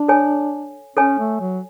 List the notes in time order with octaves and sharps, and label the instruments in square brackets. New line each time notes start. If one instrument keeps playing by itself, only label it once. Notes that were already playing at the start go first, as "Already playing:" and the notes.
Already playing: [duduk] D4
[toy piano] A4 C#5 G#5
[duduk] C#4 [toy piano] A4 C#5 G#5
[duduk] A3
F#3